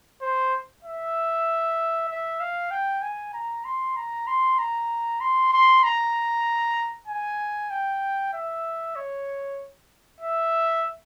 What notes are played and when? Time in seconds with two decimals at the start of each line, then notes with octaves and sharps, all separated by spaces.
0.22 C5
0.84 E5
2.09 E5
2.40 F5
2.71 G5
3.02 G#5
3.34 A#5
3.65 C6
3.96 A#5
4.27 C6
4.59 A#5
5.21 C6
5.52 C6
5.83 A#5
7.08 G#5
7.71 G5
8.33 E5
8.96 C#5
10.20 E5